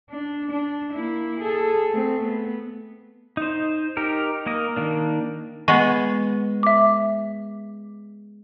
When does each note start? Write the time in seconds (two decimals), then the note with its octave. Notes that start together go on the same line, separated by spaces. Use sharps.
0.10 D4
0.51 D4
0.93 A#3 E4
1.40 G#4 A4
1.90 A3 C4
2.22 B3
3.37 D#4 C5
3.97 D#4 G4 A#4
4.46 A#3 A#4 D#5
4.76 D#3 A#3 D4
5.68 G#3 B3 C#6
6.63 E5 D6